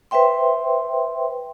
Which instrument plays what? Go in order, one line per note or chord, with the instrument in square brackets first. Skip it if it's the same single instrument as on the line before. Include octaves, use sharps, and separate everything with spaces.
[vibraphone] B4 C5 E5 G5 C6